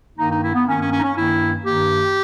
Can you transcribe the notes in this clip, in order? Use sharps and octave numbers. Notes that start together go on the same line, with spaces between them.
G2 D#3 A#3 D#4
D#4
E4
B3
G2 D#3 A#3 C#4
C#4
C#4
D#4
C#4
G2 D#3 A#3 E4
G2 D#3 A#3 G4